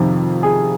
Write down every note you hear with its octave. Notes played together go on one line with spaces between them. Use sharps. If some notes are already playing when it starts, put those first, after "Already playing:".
Already playing: F2 C3 D#3
G#4